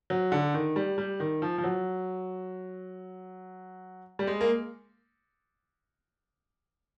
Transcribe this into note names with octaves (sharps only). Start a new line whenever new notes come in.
F#3
D3
D#3
G3
G3
D#3
F3
F3
F#3
G3
G#3
A#3